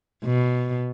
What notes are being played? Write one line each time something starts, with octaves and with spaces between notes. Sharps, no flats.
B2